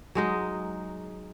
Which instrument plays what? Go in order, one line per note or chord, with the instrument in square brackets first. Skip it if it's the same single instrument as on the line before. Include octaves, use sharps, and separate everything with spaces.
[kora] F#3 G#3 D#4